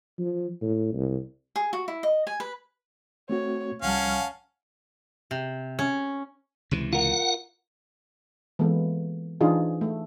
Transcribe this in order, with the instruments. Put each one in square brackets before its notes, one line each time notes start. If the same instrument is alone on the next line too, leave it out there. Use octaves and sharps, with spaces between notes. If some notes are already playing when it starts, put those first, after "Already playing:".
[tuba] F3
A2
C2
[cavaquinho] G#4
F#4
E4
D#5
G#5
B4
[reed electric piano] A3 C4 F#4 [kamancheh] C#5
[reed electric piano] C2 F3 G3 [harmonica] C#4 F5 [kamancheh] F#5 A5
[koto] C3
C#4
[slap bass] C#2 C3 E3
[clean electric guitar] F4 A#4 [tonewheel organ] F#5
[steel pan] E3 G#3 A#3 B3 A4
E3 D4 D#4 F4 G#4
A3